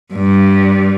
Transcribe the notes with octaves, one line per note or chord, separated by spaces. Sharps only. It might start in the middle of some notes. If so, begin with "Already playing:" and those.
G2